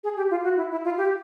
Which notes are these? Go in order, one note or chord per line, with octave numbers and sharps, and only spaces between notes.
G#4
G4
F4
F#4
E4
E4
F4
G4